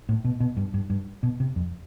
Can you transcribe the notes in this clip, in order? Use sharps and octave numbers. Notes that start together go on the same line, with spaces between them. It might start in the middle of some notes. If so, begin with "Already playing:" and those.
A2
B2
B2
G2
G2
G2
B2
C3
F2